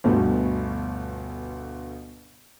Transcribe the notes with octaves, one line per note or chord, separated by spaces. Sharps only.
G1 D2 B2